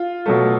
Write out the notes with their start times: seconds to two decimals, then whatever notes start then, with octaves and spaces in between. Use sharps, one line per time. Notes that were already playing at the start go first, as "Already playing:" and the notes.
Already playing: F4
0.26 B2 F#3 A3